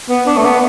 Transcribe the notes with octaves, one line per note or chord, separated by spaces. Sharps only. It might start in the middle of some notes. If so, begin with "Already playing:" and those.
B3
D4
A3
B3